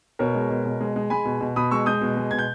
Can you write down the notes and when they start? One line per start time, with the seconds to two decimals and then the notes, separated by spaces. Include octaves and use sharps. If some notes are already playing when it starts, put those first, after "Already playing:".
0.19 B2 A#4 C#5
0.35 G#3
0.50 B2
0.65 B2
0.81 G#3
0.96 G#3
1.10 G#3 G#5 B5
1.25 B2
1.41 B2
1.56 B2 B5 D#6
1.71 G#3 C#6 E6
1.86 G#3 D#6 G6
2.01 B2
2.17 G#3
2.31 B2 G#6
2.39 G6